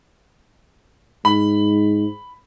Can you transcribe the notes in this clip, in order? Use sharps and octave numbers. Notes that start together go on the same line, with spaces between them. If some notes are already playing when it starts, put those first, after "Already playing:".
G#2 B5